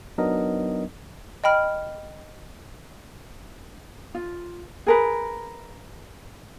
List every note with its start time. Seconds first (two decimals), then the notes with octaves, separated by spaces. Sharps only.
0.18 F#3 B3 D4 D#4 A#4 D#5
1.44 D#5 G5 B5 F6
4.15 F4
4.86 G#4 A#4 B4